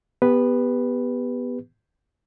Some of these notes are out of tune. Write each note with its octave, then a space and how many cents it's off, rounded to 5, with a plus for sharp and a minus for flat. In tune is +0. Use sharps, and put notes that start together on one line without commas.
B3 +0 G4 +25 B4 +0